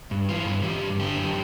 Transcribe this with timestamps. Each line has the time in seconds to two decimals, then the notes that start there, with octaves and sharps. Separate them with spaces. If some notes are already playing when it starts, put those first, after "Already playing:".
0.11 G2
0.29 E3 F4
0.46 G2
0.63 E3 G4
0.82 G2
1.00 D3 G4
1.17 F#2